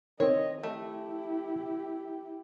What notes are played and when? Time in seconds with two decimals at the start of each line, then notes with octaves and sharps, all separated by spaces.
0.20 D#3 C4 C#5 D#5
0.63 A3 E4 G4